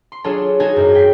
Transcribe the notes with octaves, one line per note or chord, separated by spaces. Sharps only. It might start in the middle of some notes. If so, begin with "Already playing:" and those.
C6
F#3 D4 F4 G#4 A4 C#5
D#4 F#4 G#4 A4 G#5
G#1 F#2
G5 B6 C7